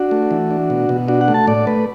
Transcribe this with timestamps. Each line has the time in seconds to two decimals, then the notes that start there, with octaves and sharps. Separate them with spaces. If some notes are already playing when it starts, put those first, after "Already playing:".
Already playing: D4 F#4
0.11 A3
0.31 E3
0.51 D4
0.70 B2
0.89 B2
1.08 D4 F#4
1.21 F#5
1.28 A3
1.34 A5
1.47 A2 D5
1.67 A3 B4